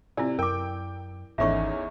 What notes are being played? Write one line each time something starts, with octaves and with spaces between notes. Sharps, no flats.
C3 E4 F4 D5 G#5
F#2 A#4 G5 D6
G#1 E2 D#3 C#4 D#4 A4 E5 C#6